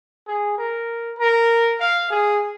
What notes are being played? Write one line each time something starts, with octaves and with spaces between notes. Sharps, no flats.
G#4
A#4
A#4
F5
G#4